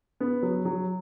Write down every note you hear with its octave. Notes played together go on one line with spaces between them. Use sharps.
B3
F#3
F#3